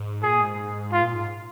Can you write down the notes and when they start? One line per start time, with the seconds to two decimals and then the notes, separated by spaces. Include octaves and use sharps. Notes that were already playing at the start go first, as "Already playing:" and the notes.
Already playing: G#2
0.23 A#2 G#4
0.40 G#2
0.93 F4
1.02 A#2
1.14 G#2